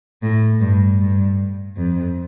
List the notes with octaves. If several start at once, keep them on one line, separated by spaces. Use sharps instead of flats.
A2
G2
G2
F2